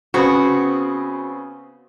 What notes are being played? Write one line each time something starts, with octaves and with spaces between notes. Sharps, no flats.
C#3 B3 C4 F#4